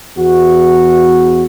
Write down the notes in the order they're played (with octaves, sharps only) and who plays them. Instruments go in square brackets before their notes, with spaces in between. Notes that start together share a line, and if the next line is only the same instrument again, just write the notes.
[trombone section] E2 F#4